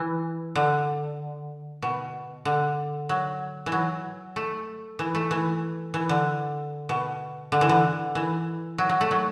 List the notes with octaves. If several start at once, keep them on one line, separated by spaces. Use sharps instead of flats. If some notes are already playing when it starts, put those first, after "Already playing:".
Already playing: E3
D3
B2
D3
F#3
E3
F#3
A3
E3
A3
E3
E3
D3
B2
D3
E3
D3
E3
F#3
F#3
A3
F#3